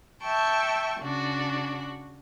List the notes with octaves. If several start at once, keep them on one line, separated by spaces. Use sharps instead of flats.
E5 G5 A5 C#6
C#3 D4 F#4